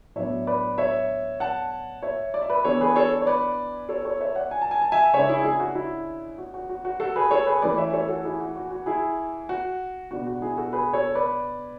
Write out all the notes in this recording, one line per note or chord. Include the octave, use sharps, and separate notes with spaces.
A2 F#3 B3 D4 C#5 E5
B4 D5
C#5 E5
F#5 A5
C#5 E5
D5
E5
B4 D5
E3 B3 D4 A4 C#5
G#4 B4
A4 C#5
C#5
B4 D5
A4 C#5
A4 C#5
C#5 E5
D5 F#5
G#5
A5
G#5
A5
E5 G#5
C#3 G#3 D4 C#5 E5
E4 G#4
E4 G#4
F#4
E4
F#4
F#4
F#4
F#4
F#4 A4
G#4 B4
A4 C#5
G#4 B4
E3 A3 C#4 B4 D5
C#5 E5
A4 C#5
F#4 A4
E4 G#4
F#4
F#4
F#4
E4 G#4
F#4
B2 G#3 B3 D4 F#4
F#4
E4 G#4
F#4 A4
G#4 B4
A4 C#5
B4 D5